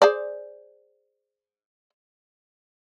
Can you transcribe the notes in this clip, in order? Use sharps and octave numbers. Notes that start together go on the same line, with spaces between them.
G#4 C5 D5